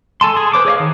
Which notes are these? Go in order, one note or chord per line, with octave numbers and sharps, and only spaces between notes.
A4 G#5 A5 C6
G#4
B4 C5 D6
G#4 C#5 D#5 F5
D#3